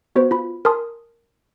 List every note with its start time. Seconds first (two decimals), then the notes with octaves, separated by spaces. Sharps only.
0.16 B3 F#4 B4 C5
0.31 F4 B5
0.65 A#4 G#5 A5 C6 D#6